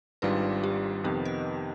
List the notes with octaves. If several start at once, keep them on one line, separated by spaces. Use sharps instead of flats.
G#1 G#2 G3 D4 F4 B4
G4
F2 C3 D#3 B3 G4
D#5